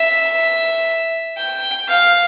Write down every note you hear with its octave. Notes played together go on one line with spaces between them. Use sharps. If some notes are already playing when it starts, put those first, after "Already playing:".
Already playing: E5
G5
F5